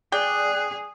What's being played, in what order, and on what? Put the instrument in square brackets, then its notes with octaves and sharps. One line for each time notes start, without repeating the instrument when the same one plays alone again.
[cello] G#4 [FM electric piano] D5 [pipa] G5 [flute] F#6